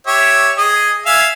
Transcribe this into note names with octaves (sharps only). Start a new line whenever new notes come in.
G4 C#5 E5
G#4 D#5
E5 F5 G#5